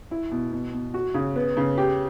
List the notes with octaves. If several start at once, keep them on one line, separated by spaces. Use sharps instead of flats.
E4
B2
B2
B2
F#4
C#3
B3
C#3
G4